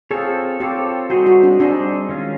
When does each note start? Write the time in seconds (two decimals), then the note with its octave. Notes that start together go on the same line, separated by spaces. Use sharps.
0.11 C4 F4 G#4 A4 C#5
0.60 C4 F4 G4 A4 C#5
1.10 G3 C4 D#4 F#4 G#4 C5
1.26 F#4
1.43 D4
1.60 G3 C4 D4 D#4 G#4 C5
2.09 D#3 G#3 C#4 F4